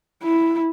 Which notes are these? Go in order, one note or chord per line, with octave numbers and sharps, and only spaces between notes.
E4